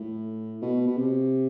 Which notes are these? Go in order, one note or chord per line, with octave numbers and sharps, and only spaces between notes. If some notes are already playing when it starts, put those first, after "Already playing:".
Already playing: A2
B2
B2
C3